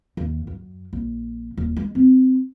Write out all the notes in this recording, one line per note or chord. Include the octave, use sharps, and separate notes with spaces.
D#2
F#2
A#1
D#1
G#3
C4